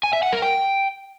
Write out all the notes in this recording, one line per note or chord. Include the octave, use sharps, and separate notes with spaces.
G#5
E5
F#5
A#4
G5